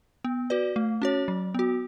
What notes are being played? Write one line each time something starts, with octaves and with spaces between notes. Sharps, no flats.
B3
F#4 B4 D5
A3
C#4 F#4 C#5
F#3
B3 F#4